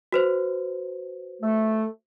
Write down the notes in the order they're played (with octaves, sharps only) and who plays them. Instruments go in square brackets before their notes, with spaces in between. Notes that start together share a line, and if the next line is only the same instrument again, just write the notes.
[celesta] F#4 B4 C5
[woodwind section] A3